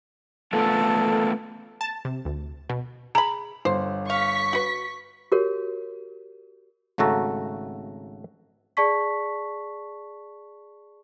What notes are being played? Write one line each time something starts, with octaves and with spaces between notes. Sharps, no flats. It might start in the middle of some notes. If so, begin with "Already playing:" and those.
A3 B3 F4 A4 A5
A5
C3
D2
B2
G#4 A#5 B5
G1 C5
F5 C#6 B6
F#4 B4
F#4 G4 A#4 C#5
G#1 C#3 A3 F#4 A4 A#5
G#4 D5 A5 C#6 B6